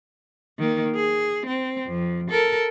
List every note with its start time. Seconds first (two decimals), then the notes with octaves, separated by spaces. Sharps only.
0.59 D#3 A#3
0.96 G#4
1.46 C4
1.87 F2
2.31 A4 A#4